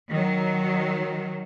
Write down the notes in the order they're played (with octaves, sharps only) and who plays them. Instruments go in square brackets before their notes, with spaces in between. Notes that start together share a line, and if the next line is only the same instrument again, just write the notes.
[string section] D#3 F#3